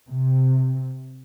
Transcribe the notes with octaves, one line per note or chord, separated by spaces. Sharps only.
C3